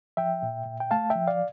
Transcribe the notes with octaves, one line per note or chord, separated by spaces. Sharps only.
F3 E5 G5
A#2
A#2
G5
A3 F5 A5
E5 G5
F3
D5 F5